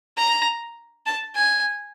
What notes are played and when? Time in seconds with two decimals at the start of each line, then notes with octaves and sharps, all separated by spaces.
0.17 A#5
1.06 A5
1.35 G#5